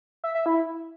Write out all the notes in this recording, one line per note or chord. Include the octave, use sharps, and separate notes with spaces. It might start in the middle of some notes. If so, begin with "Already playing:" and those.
E5
E5
E4